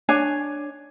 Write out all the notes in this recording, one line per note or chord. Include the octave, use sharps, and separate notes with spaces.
D4 C#5 G#5